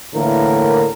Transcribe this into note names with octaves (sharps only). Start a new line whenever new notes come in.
A2 D3 E3 A#3 A#4